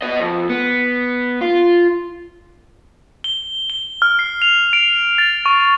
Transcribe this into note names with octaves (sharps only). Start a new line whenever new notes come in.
B3 D#5
F2
B3
F4
G7
G7
F6
C7
F7
D7
A6
C#6